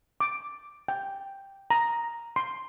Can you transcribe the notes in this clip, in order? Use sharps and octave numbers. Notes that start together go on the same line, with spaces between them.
D6
G5
A#5
C6